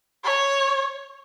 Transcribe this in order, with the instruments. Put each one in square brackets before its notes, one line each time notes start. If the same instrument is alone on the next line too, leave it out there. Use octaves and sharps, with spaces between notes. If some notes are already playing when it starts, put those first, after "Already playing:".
[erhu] C#5